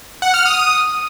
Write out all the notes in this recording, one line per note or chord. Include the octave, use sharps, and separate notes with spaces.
F#5
F6
D#6